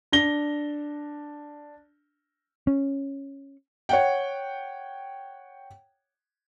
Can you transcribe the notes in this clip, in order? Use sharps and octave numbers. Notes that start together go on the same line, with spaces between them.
D4 A#6 G7
C#4
C#5 F#5 G5